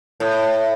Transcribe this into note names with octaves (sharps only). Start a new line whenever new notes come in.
A2